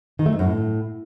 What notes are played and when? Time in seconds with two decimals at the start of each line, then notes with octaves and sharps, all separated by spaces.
0.19 D#3
0.26 A3
0.32 F2
0.39 F#2
0.46 A2